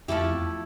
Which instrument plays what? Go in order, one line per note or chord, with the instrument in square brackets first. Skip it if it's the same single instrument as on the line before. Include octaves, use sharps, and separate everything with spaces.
[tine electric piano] F2 [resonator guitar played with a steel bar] F3 A3 E4 G4
[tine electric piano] E2